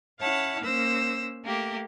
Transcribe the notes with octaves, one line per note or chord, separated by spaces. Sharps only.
C#4 E4 C#5 F5 F#5 A5
A#3 C#4 C5 E6 A#6
A3 A#3 G4